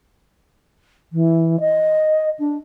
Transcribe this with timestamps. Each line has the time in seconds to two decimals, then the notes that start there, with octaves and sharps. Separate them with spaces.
1.13 E3
1.60 D#5
2.39 D4